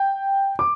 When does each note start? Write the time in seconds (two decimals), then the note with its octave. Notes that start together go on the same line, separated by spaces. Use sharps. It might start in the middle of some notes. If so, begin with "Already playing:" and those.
Already playing: G5
0.59 D6